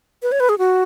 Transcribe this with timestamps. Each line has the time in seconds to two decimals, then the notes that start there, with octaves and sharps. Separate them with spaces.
0.23 B4
0.32 C#5
0.40 B4
0.49 G#4
0.58 F#4